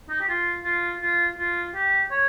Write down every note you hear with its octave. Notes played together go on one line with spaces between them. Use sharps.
D#4
G4
F4
F4
F4
F4
G4
C#5